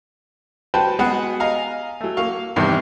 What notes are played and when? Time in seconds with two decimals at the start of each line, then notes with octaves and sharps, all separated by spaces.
0.74 F#4 B4 C5 G5 A5
0.99 G#3 B3 F#4 G#4 B4 F#5
1.40 D#5 F5 G#5 A#5
2.01 F#3 A3
2.17 A#3 F5 C#6
2.56 E2 G2 C3 D#3